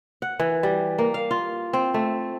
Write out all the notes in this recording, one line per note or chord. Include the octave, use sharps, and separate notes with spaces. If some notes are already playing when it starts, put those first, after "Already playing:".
F#5
E3
G3
A#3
F5
F4
C4
A3